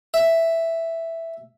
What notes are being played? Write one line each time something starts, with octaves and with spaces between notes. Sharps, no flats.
E5